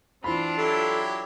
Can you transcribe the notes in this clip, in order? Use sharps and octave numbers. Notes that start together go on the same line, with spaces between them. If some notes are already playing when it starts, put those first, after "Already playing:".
E3 C4 D4 F4 B5
F#3 E4 G4 A4